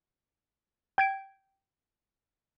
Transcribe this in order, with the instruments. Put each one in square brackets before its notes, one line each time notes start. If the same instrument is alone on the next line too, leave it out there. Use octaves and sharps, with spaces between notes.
[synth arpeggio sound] G5 G#6 D7